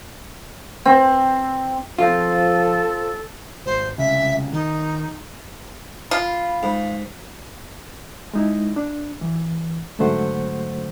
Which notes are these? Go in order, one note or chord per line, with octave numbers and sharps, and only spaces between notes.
C4
F3 C4 F4 A4
G#1 C5
C2 C#3 E5
D#3 D#4
F4 B5
G#2
G#3 D#4 E4
D4
E3
G#2 D3 F#3 A3 C5 F#5